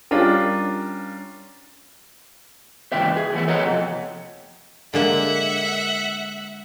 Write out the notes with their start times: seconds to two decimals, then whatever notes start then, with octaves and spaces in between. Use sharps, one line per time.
0.11 G3 C#4 D4 F4 A#4
2.92 D#2 G#2 C#3 E3 G4 E5
3.17 G#4
3.33 A2 E3 B3 E4
3.48 A4 C#5 D#5 F#5 A#5
3.65 F2 C3
4.94 D3 G#3 A#3 E5 F#5